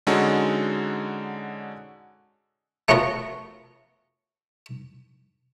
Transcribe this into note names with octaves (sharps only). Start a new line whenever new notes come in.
D3 G#3 C#4 D#4 F#4 A4
A3 B3 C#4 F4 F#4 A#4